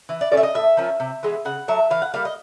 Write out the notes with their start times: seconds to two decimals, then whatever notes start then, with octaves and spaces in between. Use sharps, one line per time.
0.09 E3
0.21 D5
0.32 A3 C#4 D5
0.37 E5
0.43 D#5
0.54 A2 E5
0.77 F3 A#3 C#4
1.00 C3
1.23 E3 G#3 B3
1.45 C#3 F#5
1.68 F#3 A3 E5
1.90 E3 F5
2.02 F#5
2.14 G3 A#3 F5
2.25 D#5